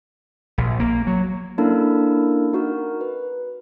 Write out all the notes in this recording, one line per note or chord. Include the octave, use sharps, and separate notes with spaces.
A#1
A#3
F#3
A#3 C#4 D4 E4 A4 A#4
D#4 F#4 A#4
B4